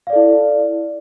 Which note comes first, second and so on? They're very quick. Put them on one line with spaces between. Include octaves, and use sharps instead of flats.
F5 D5 A4 E4